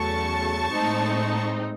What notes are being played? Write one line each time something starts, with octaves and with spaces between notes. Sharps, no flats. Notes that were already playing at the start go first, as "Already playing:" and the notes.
Already playing: E2 C#3 F#3 A3 A5 C#6
A2 G#3 C4 D#4